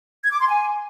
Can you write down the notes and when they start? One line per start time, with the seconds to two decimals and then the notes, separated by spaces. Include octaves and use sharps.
0.24 G#6
0.32 D6
0.40 C6
0.47 G#5